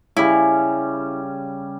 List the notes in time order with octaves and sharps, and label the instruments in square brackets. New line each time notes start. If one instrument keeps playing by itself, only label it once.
[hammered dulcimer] C#3 G3 [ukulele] E4